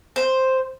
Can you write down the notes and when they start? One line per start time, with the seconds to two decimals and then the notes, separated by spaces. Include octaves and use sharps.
0.16 C5